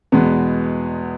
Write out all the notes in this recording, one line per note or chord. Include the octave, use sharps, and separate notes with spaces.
E2 B2 G#3 B3